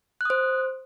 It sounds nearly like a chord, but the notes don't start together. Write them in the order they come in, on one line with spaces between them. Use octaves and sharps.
F#6 D#6 C5